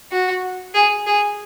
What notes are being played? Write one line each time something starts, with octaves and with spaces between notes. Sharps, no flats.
F#4
G#4
G#4